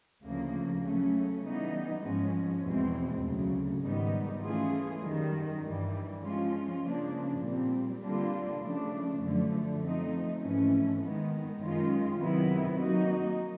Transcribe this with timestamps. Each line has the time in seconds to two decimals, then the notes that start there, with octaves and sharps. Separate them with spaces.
0.23 D2 C#3 F3 A#3
0.83 C#3 F#3 A3 C#4
1.43 E3 G3 B3 D#4
2.03 G#2 F3 G#3 C#4
2.63 E2 B2 G#3 C4
3.22 D2 C#3 F#3
3.82 G#2 D#3 G3 B3 D#4
4.42 E3 A3 C#4 F4 G#4
5.02 F#2 D#3 G3
5.62 G2 E3 G3
6.22 F3 G#3 C#4 F4
6.82 C#3 F3 A#3 D4
7.41 A#2 G3 C4
8.01 D3 G3 A#3 D4 F4
8.61 C#3 F3 A3 D4
9.20 F#2 D3 F3 A3
9.80 F3 A3 C4 D#4
10.41 G#2 E3 A3 C#4
11.00 D#3 G#3 B3
11.60 F#2 D#3 G#3 C#4 F4
12.20 C3 D#3 F#3 B3 E4
12.80 F#3 A#3 D#4 F#4